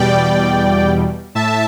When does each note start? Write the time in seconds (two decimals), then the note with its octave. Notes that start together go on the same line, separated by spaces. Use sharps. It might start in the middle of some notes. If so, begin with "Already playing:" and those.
Already playing: E2 B2 G3 D5 G5
1.35 A2 E5 A5